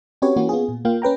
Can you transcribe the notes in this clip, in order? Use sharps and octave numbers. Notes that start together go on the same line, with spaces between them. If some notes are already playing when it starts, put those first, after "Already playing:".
C4 C#4 F#4 G4 B4 C#5
E3 A#3 C#4 F#4
B3 F4 G#4
A#2
A#3 F4 F5 G5
C#4 B4 G5 A#5